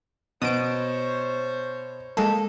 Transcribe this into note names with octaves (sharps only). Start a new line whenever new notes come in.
B2 C5 C#5 D#6 D7
G#3 A#3 A4